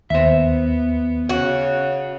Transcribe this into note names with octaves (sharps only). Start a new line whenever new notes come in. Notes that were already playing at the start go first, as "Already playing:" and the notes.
D#2 B3 C5 E5
C#3 F#4